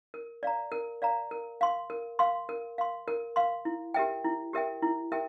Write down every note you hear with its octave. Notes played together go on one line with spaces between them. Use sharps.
A#4
D5 F5 A#5
A#4
D5 F5 A#5
A#4
F5 C6
A#4
F5 C6
A#4
F5 C6
A#4
F5 C6
E4
G4 A#4 E5 G5
E4
G4 A#4 E5 G5
E4
G4 A#4 E5 G5